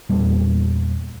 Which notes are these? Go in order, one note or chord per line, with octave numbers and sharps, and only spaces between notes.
E2 A#2 G3 A3